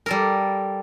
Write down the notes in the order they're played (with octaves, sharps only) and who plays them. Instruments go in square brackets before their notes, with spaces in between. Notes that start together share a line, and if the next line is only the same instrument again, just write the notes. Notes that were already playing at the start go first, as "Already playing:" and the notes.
[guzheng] G3 A4 A#4